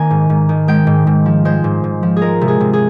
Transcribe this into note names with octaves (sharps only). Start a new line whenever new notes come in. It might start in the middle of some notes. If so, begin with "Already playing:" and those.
Already playing: D#3 A#3 G#5
G#2
G#2
D#3
G#3 G5
G#2
G#2
F3
G#3 C5
G#2
G#2
F3
G#4
G#3 A#4
C3
G#4
C3
G#4